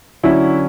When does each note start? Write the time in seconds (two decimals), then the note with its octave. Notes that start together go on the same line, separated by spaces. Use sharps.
0.23 D3 F#3 C#4 E4